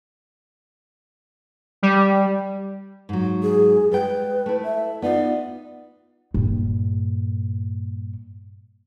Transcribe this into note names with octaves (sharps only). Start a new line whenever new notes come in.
G3
G#2 F#3
G#4
G3 G#3 B4 G5
A3 E4
E5
B3 D#4 F4 D5
G2 A#2